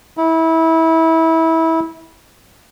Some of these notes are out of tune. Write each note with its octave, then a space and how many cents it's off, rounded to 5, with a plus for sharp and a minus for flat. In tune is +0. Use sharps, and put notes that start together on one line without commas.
E4 -25